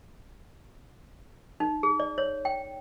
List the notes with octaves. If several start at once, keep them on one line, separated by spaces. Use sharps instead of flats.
D#4
G#4
D5
C#5
G5